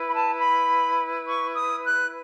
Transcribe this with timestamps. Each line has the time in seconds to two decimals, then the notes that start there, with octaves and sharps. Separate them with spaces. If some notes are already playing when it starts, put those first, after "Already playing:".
Already playing: E4 B4
0.08 B5
0.14 A5
0.37 B5
1.26 C#6
1.56 D#6
1.85 F#6